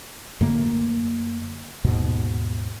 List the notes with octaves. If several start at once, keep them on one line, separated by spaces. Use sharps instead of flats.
F#2 D3 A3 A#3
D#2 G#2 B2